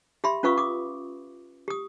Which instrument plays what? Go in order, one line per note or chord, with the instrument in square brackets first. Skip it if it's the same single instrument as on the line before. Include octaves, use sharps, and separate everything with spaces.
[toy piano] G4 E5 B5 C6
C#4 F4 B4 F5 C#6 D#6
D6 D#6
G4 D#6